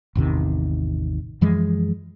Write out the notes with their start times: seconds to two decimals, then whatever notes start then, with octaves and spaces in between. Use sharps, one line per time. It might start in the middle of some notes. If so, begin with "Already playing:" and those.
0.15 A1 E2 C3 D#3
1.41 F#2 E3 F3 G#3